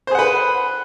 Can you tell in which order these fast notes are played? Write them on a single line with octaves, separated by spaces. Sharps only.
C5 G#4 F#5 B4